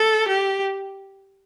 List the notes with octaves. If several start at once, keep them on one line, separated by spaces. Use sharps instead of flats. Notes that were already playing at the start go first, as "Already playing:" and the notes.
Already playing: A4
G4